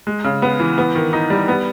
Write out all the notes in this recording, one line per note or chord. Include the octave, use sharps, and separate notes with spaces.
G#3
C#3
B3
E3
B3
D#3
D#4
G3
B3